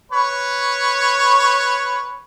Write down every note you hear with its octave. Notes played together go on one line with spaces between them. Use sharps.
B4 C#5